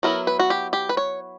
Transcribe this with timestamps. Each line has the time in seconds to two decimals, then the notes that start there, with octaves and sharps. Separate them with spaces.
0.03 F#3 B3 E4 A#4
0.27 B4
0.39 F#4
0.50 G4
0.73 G4
0.89 B4
0.97 C#5